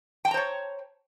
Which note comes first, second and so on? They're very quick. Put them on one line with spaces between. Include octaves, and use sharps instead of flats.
G5 A5 A#5 C5 C#5